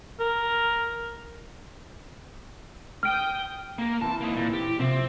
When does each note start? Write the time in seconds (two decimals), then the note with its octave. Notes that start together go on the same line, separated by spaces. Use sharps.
0.19 A#4
3.03 G5 D#6 F6 G6 D7
3.78 A#3 A#4
4.01 E3 C4 A5
4.21 A#3 D#4
4.36 A#2
4.53 G4
4.79 C3 F3 C4